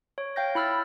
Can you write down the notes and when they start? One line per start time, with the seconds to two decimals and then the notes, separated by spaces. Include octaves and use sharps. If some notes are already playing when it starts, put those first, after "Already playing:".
0.18 C#5
0.36 F5 G5 G6 A#6
0.55 E4 B5 E6 F6 A6